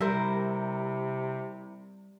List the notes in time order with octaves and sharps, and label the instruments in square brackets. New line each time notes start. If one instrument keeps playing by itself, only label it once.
[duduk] C3 [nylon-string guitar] G3 [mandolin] E4 A#4 C5